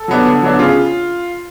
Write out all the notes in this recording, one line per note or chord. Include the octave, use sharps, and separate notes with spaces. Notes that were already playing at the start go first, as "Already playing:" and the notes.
Already playing: A4
F#3 B3 D4
D3
F#3 B3 D4
C#3 F4